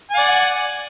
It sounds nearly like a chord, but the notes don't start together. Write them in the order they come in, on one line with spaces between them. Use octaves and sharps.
G#5 F#5 D5